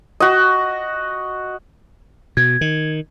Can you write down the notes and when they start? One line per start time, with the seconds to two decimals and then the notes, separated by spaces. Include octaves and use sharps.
0.20 F#4 D#5
2.37 B2 G#6
2.61 D#3